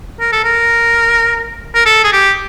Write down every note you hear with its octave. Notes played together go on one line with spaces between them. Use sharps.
A#4
A4
A#4
A#4
A4
G#4
G4